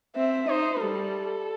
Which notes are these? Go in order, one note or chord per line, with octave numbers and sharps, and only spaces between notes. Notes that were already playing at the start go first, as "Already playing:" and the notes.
C4 E5
D#4 C5
G3 A4